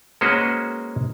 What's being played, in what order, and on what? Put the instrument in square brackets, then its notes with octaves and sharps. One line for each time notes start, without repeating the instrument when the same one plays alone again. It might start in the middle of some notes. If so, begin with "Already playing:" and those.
[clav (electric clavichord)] G#3 A#3 C#4 F#4 B4 C5